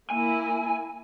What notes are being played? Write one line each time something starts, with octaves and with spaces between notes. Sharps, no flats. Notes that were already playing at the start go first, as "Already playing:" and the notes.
A#3 E4 G#5